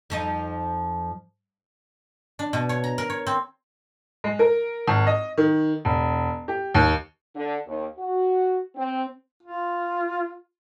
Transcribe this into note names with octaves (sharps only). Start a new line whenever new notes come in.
F2 F3 D#4
D4
B2
C#5
A#5
A#4
C#5
C4
G#3
A#4
G#1
D#5
D#3
E1
G4
D#2
D3
D#2
F#4
C4
F4